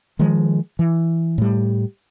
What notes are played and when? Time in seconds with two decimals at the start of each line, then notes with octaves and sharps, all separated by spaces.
0.19 D#3 F3 G#3
0.79 E3
1.38 A2 G3